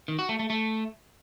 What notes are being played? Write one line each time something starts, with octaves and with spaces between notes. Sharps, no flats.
D#3
F#4
A3
A3
A3